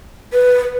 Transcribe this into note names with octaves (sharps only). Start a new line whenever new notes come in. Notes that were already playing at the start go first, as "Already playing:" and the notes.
B4